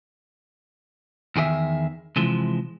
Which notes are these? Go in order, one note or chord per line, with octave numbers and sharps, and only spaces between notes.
E2 D#3 G#4 D5 E5
C3 E3 F3 G#3